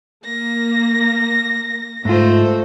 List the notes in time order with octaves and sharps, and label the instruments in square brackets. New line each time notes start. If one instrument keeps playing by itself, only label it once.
[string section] A#3 [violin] A#6
[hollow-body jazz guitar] G#2 F4 [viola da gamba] A3 C5